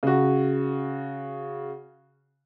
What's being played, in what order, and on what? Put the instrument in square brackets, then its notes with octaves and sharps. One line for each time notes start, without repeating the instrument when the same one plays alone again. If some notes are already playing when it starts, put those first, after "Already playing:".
[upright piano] C#3 F#4